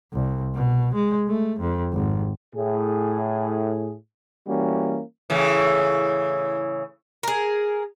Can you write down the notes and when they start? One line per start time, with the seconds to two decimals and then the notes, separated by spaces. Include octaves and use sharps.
0.13 C2
0.54 B2
0.95 G#3
1.28 A3
1.60 F2
1.93 G#1
2.55 A2 G#4
4.46 E3 G3 A#3 C#4 F#4
5.30 A2 C#3 E3
7.23 G#4 A#4